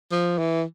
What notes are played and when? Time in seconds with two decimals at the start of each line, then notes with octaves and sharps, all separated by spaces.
0.12 F3
0.38 E3